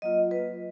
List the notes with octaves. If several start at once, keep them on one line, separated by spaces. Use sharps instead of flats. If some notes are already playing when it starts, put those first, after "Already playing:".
F#3 A#3 F4 D#5
B4